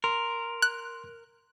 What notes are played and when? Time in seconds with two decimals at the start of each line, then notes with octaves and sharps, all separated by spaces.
0.04 A#4 C6
0.62 F#6